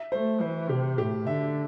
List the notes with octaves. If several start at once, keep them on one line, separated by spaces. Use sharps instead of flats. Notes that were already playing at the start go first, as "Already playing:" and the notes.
Already playing: E5
A3 C5
E3 C5
C3 G4
A2 G4
D3 E5